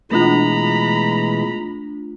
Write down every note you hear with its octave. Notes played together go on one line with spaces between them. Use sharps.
B2 E3 G#3 A3 D4 F4 A#5 B5